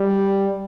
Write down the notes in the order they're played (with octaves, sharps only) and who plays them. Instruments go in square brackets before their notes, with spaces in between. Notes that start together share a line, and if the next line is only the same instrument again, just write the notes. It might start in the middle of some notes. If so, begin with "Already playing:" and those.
Already playing: [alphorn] G3